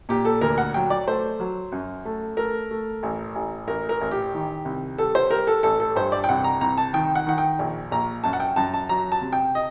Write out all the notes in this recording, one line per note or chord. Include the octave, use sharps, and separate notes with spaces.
A#2 G4
A4
D2 A#4
F#5
F#3 G5
D5
A3 C5
F#3
F#2
A3
A3 A#4
A3
A1
A1
A1 A#4
A#4
A1
G4
D#3
C2
G3 A4
C5
G3 A#4
A4
A1 A4
A4
G2 C5
D5
G5
C2 F#5
A#5
C2 A#5
A5
D#3 G5
F#5
D#3 F#5
G5
A#1
A#1 A#5
F#2 A5
F#5
G5
F#2 A5
A5
F#3 A#5
A5
C3
G5
D#5